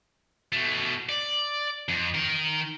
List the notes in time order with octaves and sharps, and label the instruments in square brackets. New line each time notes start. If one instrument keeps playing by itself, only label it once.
[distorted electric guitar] B2 A3
D5
F2
D#3 A#4